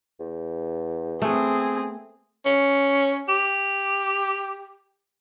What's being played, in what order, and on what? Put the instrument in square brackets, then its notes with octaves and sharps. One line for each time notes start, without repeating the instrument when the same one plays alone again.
[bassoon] E2
[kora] A3 B3 [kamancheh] C4 G#4
[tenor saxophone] C#4
G4